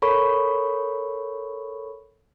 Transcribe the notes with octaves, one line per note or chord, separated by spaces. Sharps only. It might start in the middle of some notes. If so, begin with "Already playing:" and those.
A4 A#4 C#5 B5 C#6